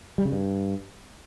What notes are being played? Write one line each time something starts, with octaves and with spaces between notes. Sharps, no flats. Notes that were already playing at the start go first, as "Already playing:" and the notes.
G3
C#3
G2